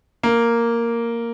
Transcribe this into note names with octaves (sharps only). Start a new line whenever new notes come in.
A#3